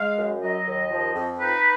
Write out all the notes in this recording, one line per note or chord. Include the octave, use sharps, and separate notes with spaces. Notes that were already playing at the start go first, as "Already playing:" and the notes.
Already playing: G#3 F5
F#2
F#3 D#5
D#2
F3
F2
D#4 B4